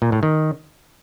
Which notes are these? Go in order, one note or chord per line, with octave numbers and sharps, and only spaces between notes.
A#2
A2
D#3